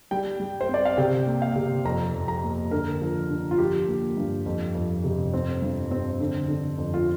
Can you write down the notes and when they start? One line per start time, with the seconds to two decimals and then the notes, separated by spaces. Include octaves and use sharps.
0.11 G3 G5
0.40 G3
0.61 C5
0.69 C4
0.74 D5
0.85 F5
0.98 C3 G5
1.27 A#3
1.42 F5
1.56 C3
1.85 F2 A#5
2.13 F2
2.28 A#5
2.43 A#3
2.71 D3 A#4
3.01 F3
3.30 D3
3.51 F4
3.58 F3 G4
3.88 A#3
4.17 G2
4.46 F2
4.75 F2
5.04 C3
5.33 C4
5.62 G2
5.91 C4
6.20 D3
6.48 D3
6.78 F2
6.94 F4